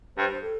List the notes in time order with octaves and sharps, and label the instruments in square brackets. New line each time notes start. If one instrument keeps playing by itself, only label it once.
[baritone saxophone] G2 [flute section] C5
[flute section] A4